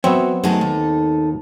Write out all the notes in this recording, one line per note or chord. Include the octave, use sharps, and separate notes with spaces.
F#3 B3 C4 C#5 E5
F#3 G#3 A3 D#4 A4
D#2